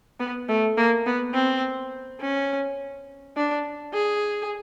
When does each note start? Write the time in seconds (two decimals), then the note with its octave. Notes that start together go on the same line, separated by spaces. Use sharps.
0.20 B3
0.49 A3
0.77 A#3
1.06 B3
1.34 C4
2.21 C#4
3.36 D4
3.94 G#4